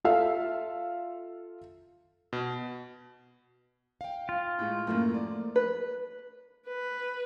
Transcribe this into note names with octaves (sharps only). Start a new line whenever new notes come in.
F4 A4 E5 F5
B2
F5 G5
F4
A2 G#3
F#2 A2 A3 A#3 A#4
F3 D5
B4
B4